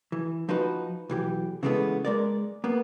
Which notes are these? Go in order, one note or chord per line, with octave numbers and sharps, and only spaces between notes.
E3
F3 D#4 F#4 B4
B1 E3 G4
C#3 E3 G#3 A3 B3
G#3 A#4 D5
A#3 B3